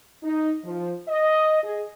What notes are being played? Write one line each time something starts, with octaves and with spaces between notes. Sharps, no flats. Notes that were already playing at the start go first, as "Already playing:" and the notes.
D#4
F3
D#5
G#4